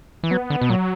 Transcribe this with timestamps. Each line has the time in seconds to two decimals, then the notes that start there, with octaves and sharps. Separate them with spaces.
0.23 E3
0.31 F#3 B3
0.50 D3
0.61 B2
0.70 A#2 F#3